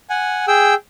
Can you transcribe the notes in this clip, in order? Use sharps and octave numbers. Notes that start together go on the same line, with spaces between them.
F#5 G#5
G#4 G5 E6